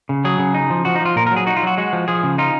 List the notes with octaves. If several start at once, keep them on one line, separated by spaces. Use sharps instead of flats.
C#3
F#3 G#4
C#3
D#4
F3
F3 F#4
D#4
F3 F4
A#2 A#4
A#4
F#3
G#4
D#4 F#4
F4
F#3 F#4
G#3 F#4
F3
F3 G#4
C#3
D#4 F4